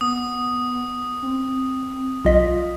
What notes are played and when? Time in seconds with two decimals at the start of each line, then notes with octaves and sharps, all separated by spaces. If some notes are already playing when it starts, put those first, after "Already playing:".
0.01 B3 D#6
1.22 C4
2.25 B1 F4 D#5 B6